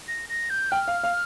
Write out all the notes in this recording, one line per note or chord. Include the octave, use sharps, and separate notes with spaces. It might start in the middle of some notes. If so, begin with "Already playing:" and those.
A#6
A#6
G6
G5 F6
F5
F5